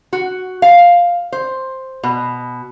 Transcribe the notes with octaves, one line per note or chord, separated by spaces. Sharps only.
F#4
F5
C5
B2